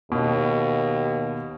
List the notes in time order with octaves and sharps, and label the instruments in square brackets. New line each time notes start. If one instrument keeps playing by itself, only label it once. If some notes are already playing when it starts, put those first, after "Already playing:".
[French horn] D#2 [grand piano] B2